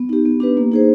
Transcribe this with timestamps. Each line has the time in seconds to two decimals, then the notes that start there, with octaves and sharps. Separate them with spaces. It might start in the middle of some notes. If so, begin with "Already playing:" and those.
Already playing: B3
0.09 D#4 G4
0.25 B3
0.40 D4 G4 B4
0.57 A#3
0.72 D#4 G#4 C5